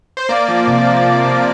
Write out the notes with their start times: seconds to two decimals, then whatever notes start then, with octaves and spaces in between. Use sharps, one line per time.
0.17 C5
0.29 A#3 D5
0.48 F3
0.68 C3
0.86 F3
1.05 C3
1.24 C3